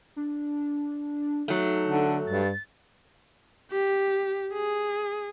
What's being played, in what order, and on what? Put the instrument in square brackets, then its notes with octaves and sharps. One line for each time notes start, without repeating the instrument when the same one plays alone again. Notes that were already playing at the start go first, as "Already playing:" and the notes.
[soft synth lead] D4
[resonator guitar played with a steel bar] F#3 A3 [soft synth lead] D#4
[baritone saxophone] D3
[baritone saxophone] G2 [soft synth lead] A6
[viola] G4
G#4